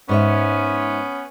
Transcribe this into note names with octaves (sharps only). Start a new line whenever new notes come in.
G#2 B3 C#4 C#5 E5